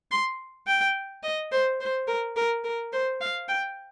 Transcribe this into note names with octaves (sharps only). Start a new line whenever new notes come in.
C6
G5
D#5
C5
C5
A#4
A#4
A#4
C5
F5
G5